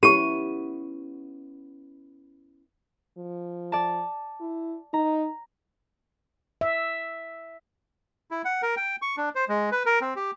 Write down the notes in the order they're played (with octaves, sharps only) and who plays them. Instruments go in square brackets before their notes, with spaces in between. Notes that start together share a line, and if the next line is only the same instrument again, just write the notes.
[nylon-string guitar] B3 C#4 E4 [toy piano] G4 C#6 [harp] D#7
[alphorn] F3
[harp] D5 A5
[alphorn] E4
[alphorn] D#4 [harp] A#5
[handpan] E5
[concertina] E4
F#5
A#4
G5
C#6
D4
C5
G#3
B4
A#4
C4
G4